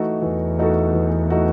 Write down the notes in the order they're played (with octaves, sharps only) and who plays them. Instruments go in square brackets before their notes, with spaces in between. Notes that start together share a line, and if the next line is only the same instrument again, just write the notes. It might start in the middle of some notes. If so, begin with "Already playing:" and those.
Already playing: [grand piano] E3 A3 D#4 F#4 A4
[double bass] E2 [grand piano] E3
[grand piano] A3 D#4 F#4 A4
E3
A3 D#4 F#4 A4